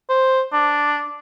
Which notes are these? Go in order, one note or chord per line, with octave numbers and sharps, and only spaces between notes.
C5
D4